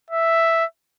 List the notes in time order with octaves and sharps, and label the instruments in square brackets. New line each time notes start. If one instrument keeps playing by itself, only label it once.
[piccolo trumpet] E5